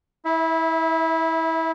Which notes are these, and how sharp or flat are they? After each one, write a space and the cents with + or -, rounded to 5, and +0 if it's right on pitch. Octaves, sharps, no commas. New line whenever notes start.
E4 -25 E5 +0